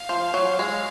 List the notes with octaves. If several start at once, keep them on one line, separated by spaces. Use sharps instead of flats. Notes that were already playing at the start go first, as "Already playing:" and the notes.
Already playing: F5
F3
F#3
G#3